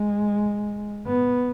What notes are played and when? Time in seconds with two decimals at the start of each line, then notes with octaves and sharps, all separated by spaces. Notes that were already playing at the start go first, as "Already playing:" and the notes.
Already playing: G#3
1.07 B3